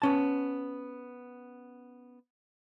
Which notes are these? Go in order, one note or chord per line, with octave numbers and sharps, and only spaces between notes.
B3 C#4 A5